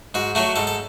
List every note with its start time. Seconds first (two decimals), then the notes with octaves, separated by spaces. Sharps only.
0.14 G#2 F#4
0.35 F#3 A3 F#4
0.56 G#2 A4
0.67 A4